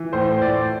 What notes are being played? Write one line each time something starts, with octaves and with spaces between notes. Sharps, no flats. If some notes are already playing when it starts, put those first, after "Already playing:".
Already playing: E3
A2 C5
A2 D5